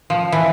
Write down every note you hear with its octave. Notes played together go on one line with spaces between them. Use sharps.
F3
E3